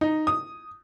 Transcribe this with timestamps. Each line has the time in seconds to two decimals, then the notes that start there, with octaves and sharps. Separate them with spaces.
0.01 D#4
0.27 D#6